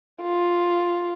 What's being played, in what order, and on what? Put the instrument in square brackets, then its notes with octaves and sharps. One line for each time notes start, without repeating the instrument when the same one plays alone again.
[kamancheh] F4